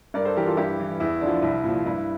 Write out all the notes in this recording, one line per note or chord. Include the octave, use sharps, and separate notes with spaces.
G2 A#4 D5
A4 C5
E3 G4 A#4
F4 A4
G2 E4 G4
E3
E2 E4
D3 F3 D4
C2 E4
A#2 F3
G2 E4